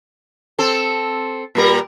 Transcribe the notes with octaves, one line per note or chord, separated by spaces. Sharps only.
C4 A4
A#2 G3 A#4